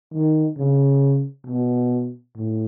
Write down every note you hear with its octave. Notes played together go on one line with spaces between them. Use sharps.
D#3
C#3
B2
A2